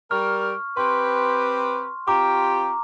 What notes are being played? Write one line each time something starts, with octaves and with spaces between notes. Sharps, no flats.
G3 A#4 C#6 F6
C4 G4 B4 C6
C4 F4 G4 A#5 D6